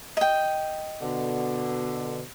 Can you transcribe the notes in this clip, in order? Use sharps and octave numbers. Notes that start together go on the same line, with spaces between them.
D#5 G5
B2 D3